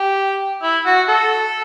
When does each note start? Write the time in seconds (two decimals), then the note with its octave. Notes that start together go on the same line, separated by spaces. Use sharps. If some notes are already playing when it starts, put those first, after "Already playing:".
Already playing: G4
0.63 E4
0.86 F#4
1.08 A4